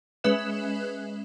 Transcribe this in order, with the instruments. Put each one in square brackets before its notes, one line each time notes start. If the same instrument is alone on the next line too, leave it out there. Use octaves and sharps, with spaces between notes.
[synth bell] G#3 C#4 B4 E5 F#6 E7